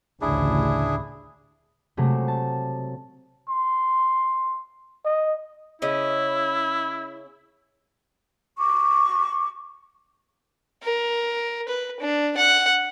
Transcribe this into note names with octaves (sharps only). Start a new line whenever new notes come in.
A1 D2 C#3 D4 E4 G#4
C3 F#3 G#3 A3
A5
C6
D#5
C#3 C#4 E4 D#5
C#6 D6
A#4
B4
D4
F#5